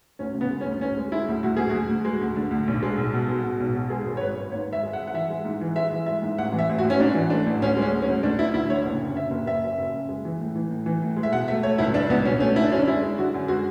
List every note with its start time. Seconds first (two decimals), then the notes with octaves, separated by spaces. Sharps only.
0.19 D2 C#4
0.34 C#3
0.41 B3
0.51 G#3
0.61 C#4
0.65 D2
0.81 D2 C#4
0.97 G#3
1.12 G#3 E4
1.28 D2
1.43 D2 F#4
1.57 D2 G#4
1.69 F#4
1.75 D2
1.89 D2
2.05 G#3
2.21 D2
2.36 D3
2.51 D2
2.68 B1
2.82 G#3
2.98 B1
3.13 B2
3.29 G#3
3.44 B2
3.60 B1
3.76 B2
3.90 G#3 G#4
4.06 G#1
4.17 C#5
4.21 G#1 B4
4.37 G#1
4.52 G#2 C#5
4.67 G#1
4.73 E5
4.83 G#3
4.93 F#5
4.98 G#1
5.07 F#5
5.14 E3 E5
5.30 G#3
5.45 G#2
5.61 E3
5.76 G#3 E5
5.91 E3
6.06 G#3 E5
6.22 G#2
6.38 A1 F#5
6.53 E3
6.59 E5
6.69 A1
6.79 F#4
6.85 A1
6.90 C#4
6.99 G#2 D4
7.15 E3
7.30 A3 D4
7.46 A1
7.62 D2 C#4
7.77 G#3
7.82 C#4
7.92 D2
8.02 C#4
8.08 D2
8.23 D2 D4
8.39 D3 E4
8.54 D2 E4
8.70 D3 C#5
8.86 F#1
9.01 C#3
9.16 C#3 E5
9.31 F#1
9.46 F#1 E5
9.63 F#2
9.79 F#1
9.94 C#3
10.09 G#3
10.25 E3
10.40 A2
10.55 E3
10.71 A2
10.86 E3
11.02 A2
11.16 G#3
11.23 E5
11.32 B2 F#5
11.48 A3 E5
11.63 A3 C#5
11.78 C#2 E4
11.94 C#2 D4
12.09 C#2 B3
12.25 B2 C#4
12.40 A3 C#4
12.56 D3 E4
12.64 D4
12.71 F#2 C#4
12.79 D4
12.87 G#3 E4
13.02 G#3
13.18 D3 F#4
13.34 F#2
13.48 G#3 F#4